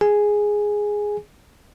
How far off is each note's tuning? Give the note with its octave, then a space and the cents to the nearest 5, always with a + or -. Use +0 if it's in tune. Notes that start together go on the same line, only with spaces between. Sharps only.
G#4 +0 G#5 +0